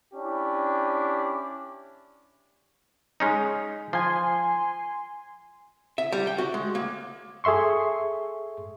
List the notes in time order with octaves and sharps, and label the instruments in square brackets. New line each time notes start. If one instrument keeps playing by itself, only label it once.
[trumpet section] C#4 D4 E4 G4
[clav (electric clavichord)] G#3 C#4 D#4
[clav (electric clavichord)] F3 [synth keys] G#5 C6
[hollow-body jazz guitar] E5
G3
G5
F#4
G#3
A#3
[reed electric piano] G#4 A4 E5 C6 C#6